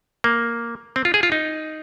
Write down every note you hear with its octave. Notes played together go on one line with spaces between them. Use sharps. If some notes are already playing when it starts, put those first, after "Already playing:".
A#3
C4
F4
G#4
F4
D#4